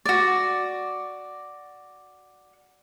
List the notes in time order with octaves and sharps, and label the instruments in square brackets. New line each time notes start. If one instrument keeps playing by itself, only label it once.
[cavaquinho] F#4 D5